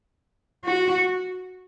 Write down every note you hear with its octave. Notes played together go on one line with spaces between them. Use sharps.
F#4